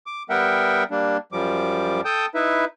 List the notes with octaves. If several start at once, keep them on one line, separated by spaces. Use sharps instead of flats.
D6
G3 B3 A#4 E5 F#5 G5
G3 A#3 D4
F#2 F3 G3 D6
A4 G5 A5 D#6 G6
D#4 E4 B4 E5